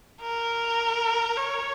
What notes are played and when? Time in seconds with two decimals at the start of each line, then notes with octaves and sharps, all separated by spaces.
0.21 A#4
1.37 C#5